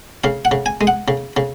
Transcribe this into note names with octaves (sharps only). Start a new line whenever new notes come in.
C#3 F5
F#5
C#3
G#5
G#3
F#5
C#3
C#3